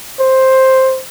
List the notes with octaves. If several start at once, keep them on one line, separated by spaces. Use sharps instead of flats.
C5